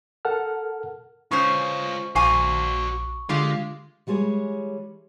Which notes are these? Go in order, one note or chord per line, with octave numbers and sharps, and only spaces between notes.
A4 A#4 F#5 A5 F6
G#3 C#4 F4 C5 C#5 C#6
A#1 F#4 C5 F5 G#5 C#6 D6
D3 G#3 F4 G4 F5
E3 G3 G#3 G#4 C#5